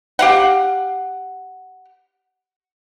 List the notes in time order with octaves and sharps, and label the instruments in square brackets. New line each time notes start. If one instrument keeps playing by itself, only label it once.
[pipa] G4 F5 F#5